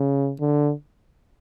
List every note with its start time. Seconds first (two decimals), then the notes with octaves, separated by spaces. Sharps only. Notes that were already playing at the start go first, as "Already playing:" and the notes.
Already playing: C#3
0.39 D3